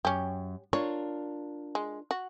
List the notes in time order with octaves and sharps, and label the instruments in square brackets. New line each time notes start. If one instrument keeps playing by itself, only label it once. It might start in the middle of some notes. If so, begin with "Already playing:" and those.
[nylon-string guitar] F#2 [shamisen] C#4 G4
[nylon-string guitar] D4 F4 A#4 [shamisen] C#5
[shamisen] G#3
F#4